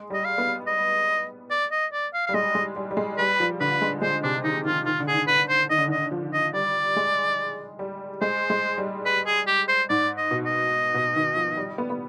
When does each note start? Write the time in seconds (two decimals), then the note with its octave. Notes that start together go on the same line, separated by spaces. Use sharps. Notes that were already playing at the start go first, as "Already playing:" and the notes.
Already playing: G#3
0.10 G3 D#5
0.25 F5
0.38 B3
0.67 D#5
1.51 D5
1.72 D#5
1.93 D5
2.14 F5
2.27 G3 F5
2.34 G#3 D#5
2.55 G#3
2.76 G3
2.91 G3
2.97 G#3
3.18 G3 B4
3.40 F3
3.60 D3 B4
3.82 G#3
4.02 G#3 C5
4.23 C3 D4
4.44 D#3 D#4
4.65 D#3 F4
4.86 D#3 F4
5.00 D3
5.08 G#4
5.14 D#3
5.27 D3 B4
5.49 C5
5.70 D#3 D#5
5.79 D3
5.88 D#3 D#5
6.11 F3
6.33 D#5
6.53 G3 D5
6.96 G#3
7.79 G3
8.21 G#3 C5
8.50 G#3
8.78 G3
9.06 B4
9.26 G#4
9.47 G4
9.68 C5
9.89 G#2 D5
10.18 D#5
10.31 B2
10.46 D#5
10.94 B2
11.16 D#3
11.36 F3
11.57 G3
11.78 B3
11.90 B3